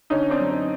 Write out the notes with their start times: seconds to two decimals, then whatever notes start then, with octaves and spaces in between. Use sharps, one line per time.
0.10 D3 C#4 D#4
0.30 C4 D4
0.40 F#2
0.50 C#4